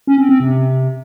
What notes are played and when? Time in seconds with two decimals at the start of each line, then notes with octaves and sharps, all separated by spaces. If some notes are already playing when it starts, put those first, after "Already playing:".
0.07 C#4
0.18 C4
0.29 C4
0.40 C3